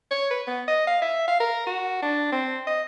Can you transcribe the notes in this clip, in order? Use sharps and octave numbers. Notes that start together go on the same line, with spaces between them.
C#5
B4
B3
D#5
F5
E5
F5
A#4
F#4
D4
C4
D#5